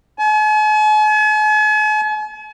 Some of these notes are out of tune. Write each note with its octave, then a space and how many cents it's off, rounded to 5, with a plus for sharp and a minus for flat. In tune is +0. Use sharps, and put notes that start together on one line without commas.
G#5 +45